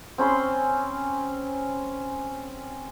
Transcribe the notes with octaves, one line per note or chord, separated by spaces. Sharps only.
C4 C#4 B5 C6